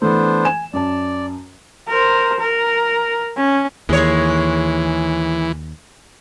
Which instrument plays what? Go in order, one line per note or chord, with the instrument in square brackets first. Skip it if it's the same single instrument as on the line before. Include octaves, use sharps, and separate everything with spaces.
[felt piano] E3 A3 [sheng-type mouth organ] B3 D4 C5
[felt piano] G#5 E7
[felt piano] F#2 A5 [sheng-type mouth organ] D5
[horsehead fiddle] A#4 C5
A#4
C#4
[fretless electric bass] D#2 [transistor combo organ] E3 [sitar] G#3 C#5